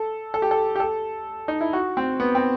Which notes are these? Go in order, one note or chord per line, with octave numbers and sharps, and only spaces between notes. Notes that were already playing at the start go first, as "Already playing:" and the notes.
Already playing: A4
A4
G4
A4
G4
A4
D#4
E4
F#4
C4
B3
C4